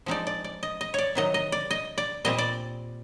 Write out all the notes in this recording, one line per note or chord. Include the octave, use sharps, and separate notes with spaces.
F3 G#3 C4 D#4 D5
D5
D5
D#5
D#5
C#5 D5
C3 D#3 F#3 D#5
D#5
D5
D#5
D5
A#2 G3 C4 D#5
D5